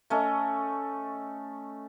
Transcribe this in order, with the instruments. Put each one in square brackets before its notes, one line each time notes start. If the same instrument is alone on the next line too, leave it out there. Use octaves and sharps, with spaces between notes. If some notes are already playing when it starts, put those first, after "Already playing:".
[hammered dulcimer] A3 C#4 D#5